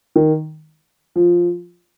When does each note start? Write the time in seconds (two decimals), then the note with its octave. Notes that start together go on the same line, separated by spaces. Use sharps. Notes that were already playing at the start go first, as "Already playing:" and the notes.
0.16 D#3
1.16 F3